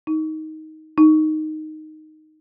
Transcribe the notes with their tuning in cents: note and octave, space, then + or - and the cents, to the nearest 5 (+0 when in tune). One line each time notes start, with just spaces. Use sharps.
D#4 +10
D#4 -5